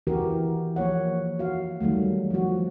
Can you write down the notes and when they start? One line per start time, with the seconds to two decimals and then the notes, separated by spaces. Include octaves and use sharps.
0.07 D#3 E3 F#4 G4 A#4
0.76 F3 A#3 C#5 F#5
1.39 F#4 F5
1.80 D#3 F#3 G3 A3
2.30 F3 F#4